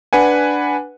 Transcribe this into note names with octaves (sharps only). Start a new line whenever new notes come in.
D4 B4 F#5 G#5